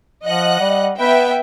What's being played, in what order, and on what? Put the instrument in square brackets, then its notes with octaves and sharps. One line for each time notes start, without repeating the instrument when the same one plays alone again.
[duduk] F3 [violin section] D#5 F#5 F#6
[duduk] G3
[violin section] B3 E5 G5 [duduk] B4